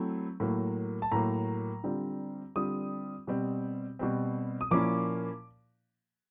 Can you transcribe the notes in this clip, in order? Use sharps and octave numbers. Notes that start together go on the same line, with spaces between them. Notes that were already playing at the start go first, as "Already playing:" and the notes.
Already playing: F#3 A3 C4 E4
A2 F#3 A#3
A5
A2 F#3 A#3 A#5
D3 G3 C4 F4
D3 G3 C4 F4 D#6
B2 G3 C4
B2 G3 C4
D#6
A#2 F3 A#3 C#4 E4 D6